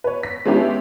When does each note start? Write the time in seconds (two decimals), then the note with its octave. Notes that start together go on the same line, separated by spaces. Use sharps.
0.04 B4 C#5
0.23 B6
0.46 G#3 B3 C#4 D4 E4 G4